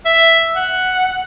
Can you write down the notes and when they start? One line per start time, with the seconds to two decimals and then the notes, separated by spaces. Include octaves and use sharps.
0.06 E5
0.56 F#5